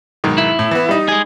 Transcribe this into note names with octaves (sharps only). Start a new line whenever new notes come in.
B1 G#2 D#3
E4
A2
E3 B3
G3 D#4
G#3 G#4